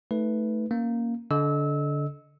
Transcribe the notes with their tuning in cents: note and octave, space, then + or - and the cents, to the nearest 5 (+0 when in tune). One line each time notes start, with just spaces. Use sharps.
A3 +0 D#4 +30 B4 +0
A#3 +0 C#4 +0
D3 -20 D#5 +0 E6 -25